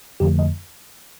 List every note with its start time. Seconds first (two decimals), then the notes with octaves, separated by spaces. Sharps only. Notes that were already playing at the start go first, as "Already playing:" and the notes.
0.20 F2 D3 F3 A3 G4
0.39 D#5